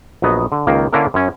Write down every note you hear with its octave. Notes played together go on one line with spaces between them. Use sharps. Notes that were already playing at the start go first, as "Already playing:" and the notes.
A#1 F#3 B3 D#5
D3
C#2 D#3 A#3
D3 A#3 C#4 D4 E4 A#4
F#2 C#4